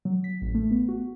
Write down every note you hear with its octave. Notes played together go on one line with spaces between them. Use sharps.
F#3
B6
A1
A3
B3
F#4